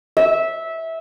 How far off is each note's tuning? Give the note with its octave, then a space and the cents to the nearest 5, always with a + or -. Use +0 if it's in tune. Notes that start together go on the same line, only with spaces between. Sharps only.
E5 -15